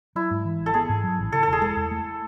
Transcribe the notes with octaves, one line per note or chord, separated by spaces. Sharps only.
F#3 E4
G#2
E3
G#1
A4
B3 G#4
G#2
F#3
A1
C#3 A4
E1 A4
G#4
G#3 A4
E2
A3